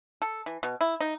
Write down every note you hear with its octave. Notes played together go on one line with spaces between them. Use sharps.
A4
E3
B2
E4
D#4